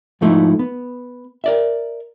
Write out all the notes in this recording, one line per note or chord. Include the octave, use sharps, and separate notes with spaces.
G#2 F3 A3 D#4 E4
B3
A#4 D5 E5